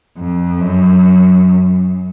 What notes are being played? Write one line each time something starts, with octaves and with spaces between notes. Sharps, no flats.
F2
F#2